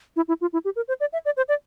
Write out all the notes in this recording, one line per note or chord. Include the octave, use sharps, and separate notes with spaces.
E4
E4
F4
E4
G4
A#4
C5
D5
E5
D5
C5
D5